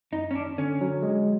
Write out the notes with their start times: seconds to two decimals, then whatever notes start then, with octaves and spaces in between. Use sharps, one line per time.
0.12 F#2 D#4
0.31 C#4
0.35 G#1 D4
0.58 D3 C#4
0.81 F#3
1.02 G#3